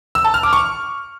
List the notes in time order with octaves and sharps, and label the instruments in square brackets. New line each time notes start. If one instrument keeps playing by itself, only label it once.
[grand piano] E6
A5
F6
D6
C#6